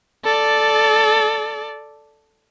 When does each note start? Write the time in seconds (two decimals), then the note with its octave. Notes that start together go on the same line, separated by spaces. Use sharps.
0.25 A4 D5